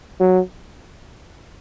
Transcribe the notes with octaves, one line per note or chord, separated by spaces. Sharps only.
F#3